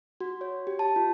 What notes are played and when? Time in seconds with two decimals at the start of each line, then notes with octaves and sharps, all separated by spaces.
0.21 F#4
0.41 C#5
0.67 G4
0.79 A5
0.96 F4